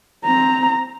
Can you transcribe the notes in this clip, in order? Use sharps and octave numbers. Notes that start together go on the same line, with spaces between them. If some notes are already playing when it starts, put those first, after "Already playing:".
C4 A#5